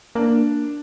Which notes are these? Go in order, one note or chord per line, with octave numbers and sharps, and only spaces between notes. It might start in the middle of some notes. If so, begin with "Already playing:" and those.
A#3 D4